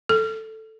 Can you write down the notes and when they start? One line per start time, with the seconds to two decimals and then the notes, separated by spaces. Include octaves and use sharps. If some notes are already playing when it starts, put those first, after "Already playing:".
0.09 A4